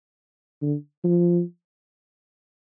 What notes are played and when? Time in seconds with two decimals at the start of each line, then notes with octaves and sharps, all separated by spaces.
0.62 D3
1.04 F3